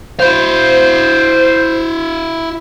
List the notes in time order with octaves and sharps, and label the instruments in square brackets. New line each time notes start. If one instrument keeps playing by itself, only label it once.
[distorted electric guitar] E4 F5 [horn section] C5